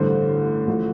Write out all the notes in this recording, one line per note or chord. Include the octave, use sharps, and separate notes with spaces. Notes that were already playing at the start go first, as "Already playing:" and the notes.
Already playing: A1 G2 D3 C5
A1 D3 F3